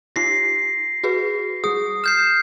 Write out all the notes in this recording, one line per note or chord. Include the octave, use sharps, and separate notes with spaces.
D#4 F4 G4 A#6 C7
F#4 G#4 B4
G3 G#4 D#6
F6 G6 C7 E7